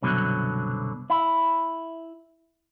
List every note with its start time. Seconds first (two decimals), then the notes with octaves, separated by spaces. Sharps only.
0.02 C2 F#2 B2 D3 F#3
1.10 E4